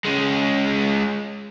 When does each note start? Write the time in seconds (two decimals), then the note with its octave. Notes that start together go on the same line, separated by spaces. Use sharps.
0.05 G#3 C#4